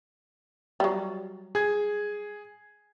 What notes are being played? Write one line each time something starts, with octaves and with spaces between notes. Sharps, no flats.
F#3 G3
G#4 G#6